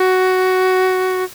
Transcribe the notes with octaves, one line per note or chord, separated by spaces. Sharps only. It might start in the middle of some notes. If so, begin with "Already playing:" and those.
Already playing: F#4